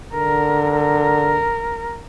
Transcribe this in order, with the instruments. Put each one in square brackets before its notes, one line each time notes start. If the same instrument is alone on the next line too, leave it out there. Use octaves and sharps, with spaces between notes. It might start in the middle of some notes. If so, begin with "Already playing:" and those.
[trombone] D3 [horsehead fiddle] A#4
[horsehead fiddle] A#4